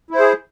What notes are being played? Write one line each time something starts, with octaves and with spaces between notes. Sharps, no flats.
E4 G#4 C5